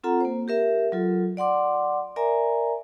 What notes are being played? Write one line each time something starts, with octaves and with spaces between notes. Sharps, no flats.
C4 F4 A4 F#5 A#5
A#3 C5
G4 A#4 E5
F#3 F4 A4
D5 F#5 C6 D6
A#4 D5 E5 G#5 A#5